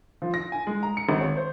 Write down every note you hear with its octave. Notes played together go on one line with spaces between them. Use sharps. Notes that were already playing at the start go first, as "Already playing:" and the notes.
F3
A#6
G#5
G#3
A#5
C#7
G#1
C#5
C5